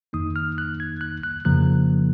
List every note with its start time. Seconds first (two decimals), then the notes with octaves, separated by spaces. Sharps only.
0.13 F2 D#3 A#3 D#4 D#6
0.36 F6
0.58 F#6
0.80 G#6
1.01 F#6
1.23 F#6
1.45 F2 C#3 F3 A#3 F#6